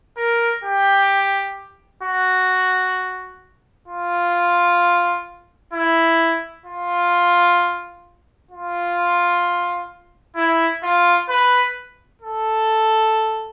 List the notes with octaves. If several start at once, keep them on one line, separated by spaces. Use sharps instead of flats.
A#4
G4
F#4
F4
E4
F4
F4
E4
F4
B4
A4